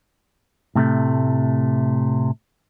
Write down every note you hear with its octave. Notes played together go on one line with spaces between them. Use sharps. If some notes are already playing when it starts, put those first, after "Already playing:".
A2 C3 A3